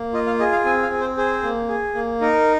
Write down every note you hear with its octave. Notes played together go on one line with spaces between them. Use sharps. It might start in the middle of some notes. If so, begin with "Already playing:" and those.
Already playing: A#3
F4 D#5
F5
G#4 D#5
F5
C4 G#5
F5
C4
C5
G#4 C5
A#3
G#4
A#3
D#4 A#4